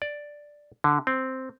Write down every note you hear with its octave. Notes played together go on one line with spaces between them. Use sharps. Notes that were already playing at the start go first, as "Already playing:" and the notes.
D5
D3
C4